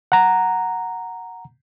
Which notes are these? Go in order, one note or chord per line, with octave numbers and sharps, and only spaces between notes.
F#5 A#5